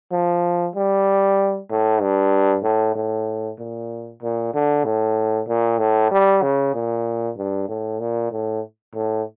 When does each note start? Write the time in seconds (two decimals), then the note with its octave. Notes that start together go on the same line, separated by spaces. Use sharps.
0.12 F3
0.75 G3
1.70 A2
2.01 G2
2.63 A2
2.95 A2
3.59 A#2
4.22 A#2
4.54 D3
4.85 A2
5.48 A#2
5.79 A2
6.11 G3
6.42 C#3
6.74 A#2
7.36 G2
7.69 A2
8.00 A#2
8.32 A2
8.95 A2